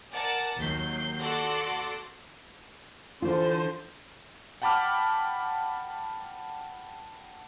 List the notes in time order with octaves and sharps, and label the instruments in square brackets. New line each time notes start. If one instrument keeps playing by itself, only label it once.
[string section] A#4 D5 F#5 G#5 A5 A6
D#2 F#3 G6 C7
F#4 A4 D5 F#5 C6
[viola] D3 C5 [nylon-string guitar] E3 F4
[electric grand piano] F#5 G5 A5 B5 D6 F6